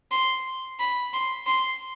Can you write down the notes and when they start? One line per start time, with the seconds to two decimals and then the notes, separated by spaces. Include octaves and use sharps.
0.12 C6
0.80 B5
1.13 C6
1.46 C6